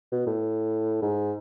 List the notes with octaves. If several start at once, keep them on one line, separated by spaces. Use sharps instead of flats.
B2
A2
G#2